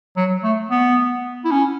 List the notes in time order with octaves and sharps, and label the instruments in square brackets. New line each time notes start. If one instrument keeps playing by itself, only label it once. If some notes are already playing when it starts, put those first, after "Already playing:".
[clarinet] F#3
A3
B3
E4
C#4